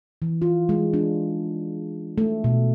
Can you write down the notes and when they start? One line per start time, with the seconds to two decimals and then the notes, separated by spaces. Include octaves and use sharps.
0.22 E3
0.42 F4
0.69 G#3
0.94 D4
2.18 A3
2.44 B2